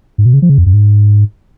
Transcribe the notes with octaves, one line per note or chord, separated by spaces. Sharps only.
G#2
B2
C#3
F3
C#3
F2
F#2
G#2